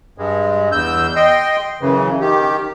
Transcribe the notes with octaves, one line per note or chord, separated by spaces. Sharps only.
G2 G#3
E2 E6 G6
D#5 G5 C6
F#2 C#3 E3
D#3 G4